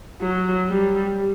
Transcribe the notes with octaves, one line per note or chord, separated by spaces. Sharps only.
F#3
G3